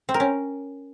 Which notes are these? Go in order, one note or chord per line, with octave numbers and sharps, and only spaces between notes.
C4
A#4
C#4